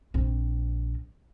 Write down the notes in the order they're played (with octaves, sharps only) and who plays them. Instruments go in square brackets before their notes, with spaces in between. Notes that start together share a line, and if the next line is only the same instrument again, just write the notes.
[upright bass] A#1 C4